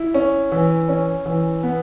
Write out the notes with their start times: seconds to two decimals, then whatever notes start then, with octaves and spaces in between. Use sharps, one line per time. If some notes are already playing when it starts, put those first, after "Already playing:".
Already playing: E4
0.14 C#4
0.52 E3
0.89 C#4
1.26 E3
1.63 B3